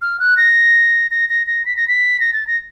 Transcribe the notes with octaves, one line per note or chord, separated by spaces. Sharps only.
F6
F#6
A#6
A#6
A#6
A#6
B6
A#6
B6
A#6
A6
A#6